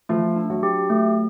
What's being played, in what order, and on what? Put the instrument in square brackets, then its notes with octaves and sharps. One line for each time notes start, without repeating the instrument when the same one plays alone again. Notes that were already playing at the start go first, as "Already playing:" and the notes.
[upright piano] F3 F4 [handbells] A3
[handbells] D4
[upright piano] F#3 F#4
[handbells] G4
A3